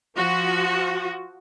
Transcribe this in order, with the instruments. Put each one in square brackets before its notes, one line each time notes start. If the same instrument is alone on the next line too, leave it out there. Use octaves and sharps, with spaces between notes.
[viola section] F3 F#4